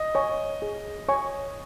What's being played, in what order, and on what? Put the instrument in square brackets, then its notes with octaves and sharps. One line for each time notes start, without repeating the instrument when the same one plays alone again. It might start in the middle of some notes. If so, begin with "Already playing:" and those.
Already playing: [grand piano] D#5
[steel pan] C#5 G#5 C#6
G#4
C#5 G#5 C#6